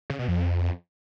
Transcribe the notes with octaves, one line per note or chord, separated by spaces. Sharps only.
C#3
B2
F2